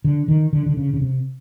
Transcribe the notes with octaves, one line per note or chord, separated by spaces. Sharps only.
D3
D#3
D3
D3
C#3
C#3
C3